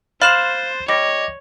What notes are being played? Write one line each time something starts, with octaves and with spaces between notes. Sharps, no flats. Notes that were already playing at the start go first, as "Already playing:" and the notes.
C5 F5 B5 C6 F#6 A6 E7 F#7
G3 C#5 D#5 D6 A#6